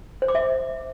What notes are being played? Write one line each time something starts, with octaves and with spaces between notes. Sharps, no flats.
C5
D6
E5